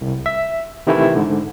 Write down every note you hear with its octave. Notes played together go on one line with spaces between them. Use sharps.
C2
E5
C3 D#3 E3 A3 E4
G#2 D3